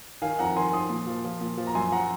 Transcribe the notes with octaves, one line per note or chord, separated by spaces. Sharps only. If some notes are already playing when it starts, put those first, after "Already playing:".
D#3 F5 G#5
F2 F#5 A#5
D#3 G#5 C6
F3 C6 D#6
A#2
F3
F3
A#2
F3
A#5
F#2 G#5 C6
F3 F#5 A#5